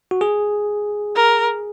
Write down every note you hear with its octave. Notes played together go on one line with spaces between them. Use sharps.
F#4
G#4
A#4